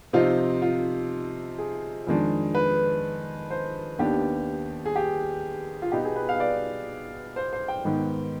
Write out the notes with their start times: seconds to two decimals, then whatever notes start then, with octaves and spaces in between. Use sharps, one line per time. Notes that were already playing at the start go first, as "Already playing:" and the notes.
0.13 C3 F3 C4 D#4 F4
0.62 F4
1.58 G#4
2.07 F2 D#3 G#3 D4
2.55 B4
3.51 C5
3.99 D#2 D#3 B3 D4 G4
4.85 G#4
4.96 G4
5.82 F4
5.92 B2 B3 D#4 G4
6.05 G#4
6.16 B4
6.29 F5
6.40 D5
7.36 C5
7.53 C5
7.68 G5
7.85 G#2 D#3 B3